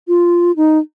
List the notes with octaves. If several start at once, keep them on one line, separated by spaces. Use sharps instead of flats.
F4
D#4